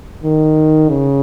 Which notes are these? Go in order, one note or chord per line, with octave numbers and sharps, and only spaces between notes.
D#3
C#3